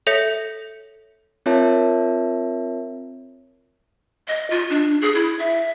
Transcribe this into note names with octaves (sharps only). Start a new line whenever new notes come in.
A4 C#5 E5 G6 A#6 C#7
C4 F4 A#4 C#5 E5 A5
D#5
F4
D4
G#4
E4
E5